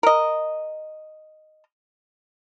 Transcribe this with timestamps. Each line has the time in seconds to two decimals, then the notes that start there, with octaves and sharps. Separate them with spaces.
0.03 A#4 D#5